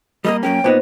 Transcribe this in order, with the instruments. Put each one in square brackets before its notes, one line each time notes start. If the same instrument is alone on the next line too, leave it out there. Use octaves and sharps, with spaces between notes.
[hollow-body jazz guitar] G3 A3 A#3 [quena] D#5
[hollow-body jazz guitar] F#2 A#3 C#4 [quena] G5
[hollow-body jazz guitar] A#2 B3 D#4 [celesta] C5